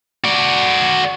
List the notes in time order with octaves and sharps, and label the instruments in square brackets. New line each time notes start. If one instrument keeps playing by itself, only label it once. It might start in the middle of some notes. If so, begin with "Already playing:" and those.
[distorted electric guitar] F#4 D5